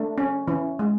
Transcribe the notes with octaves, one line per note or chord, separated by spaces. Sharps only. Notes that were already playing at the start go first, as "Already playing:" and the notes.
Already playing: A3 D4
C#4
E3 C#4
G#3